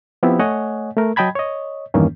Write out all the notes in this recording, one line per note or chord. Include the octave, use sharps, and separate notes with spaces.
F3 B3 C4 E4 G4
A3 C#5 D#5 F#5 G#5
A3 A#4
F#3 D#5 G5 A5 B5 G#6
C#5 D#5
E2 G2 D#3 E3 A#3 C#4